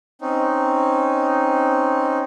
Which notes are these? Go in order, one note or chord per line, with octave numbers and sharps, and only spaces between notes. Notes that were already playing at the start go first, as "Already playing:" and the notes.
C4 C#4 D#4